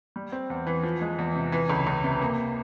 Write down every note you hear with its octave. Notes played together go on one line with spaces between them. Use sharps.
G3
C4
E2
E3
F3
G#3
E2
C3
E3
C#2
C#2
C3
A#3